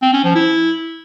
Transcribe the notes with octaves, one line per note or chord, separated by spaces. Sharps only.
C4
C#4
F3
E4